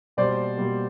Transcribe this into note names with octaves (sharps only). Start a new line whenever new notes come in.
B2 G3 A#3 C5 D5
B2 G3 A#3